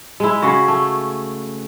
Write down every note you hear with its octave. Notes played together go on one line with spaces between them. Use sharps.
G#3 E4
C#3 C#4 F#4
A3